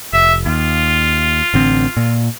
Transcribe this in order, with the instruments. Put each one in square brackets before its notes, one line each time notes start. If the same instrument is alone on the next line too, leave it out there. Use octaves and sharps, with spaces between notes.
[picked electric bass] F1 [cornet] E5
[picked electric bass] D#2 [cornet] F4
[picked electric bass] A1 D3 C4
A#2